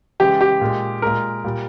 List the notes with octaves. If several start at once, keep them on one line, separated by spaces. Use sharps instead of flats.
C#3 E3 G#3 G4
G4
A#2 G#3
A#2 G#3 A#4
A#2 G3